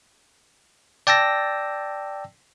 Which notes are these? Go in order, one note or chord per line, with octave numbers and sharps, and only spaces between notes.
D5 G5 A5 E6 A#6